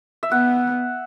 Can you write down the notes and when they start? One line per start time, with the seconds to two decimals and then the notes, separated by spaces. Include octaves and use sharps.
0.23 E5
0.31 B3 F#5